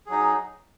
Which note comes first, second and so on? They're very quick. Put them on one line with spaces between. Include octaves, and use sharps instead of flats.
G#4 F#3 D#4